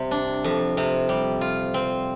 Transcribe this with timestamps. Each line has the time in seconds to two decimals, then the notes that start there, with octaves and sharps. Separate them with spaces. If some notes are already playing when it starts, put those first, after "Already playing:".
Already playing: C3 G3
0.11 D4
0.44 F2
0.77 C3
1.09 G3
1.41 F4
1.74 C4